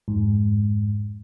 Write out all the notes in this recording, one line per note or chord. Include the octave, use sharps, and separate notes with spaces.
F2 G#2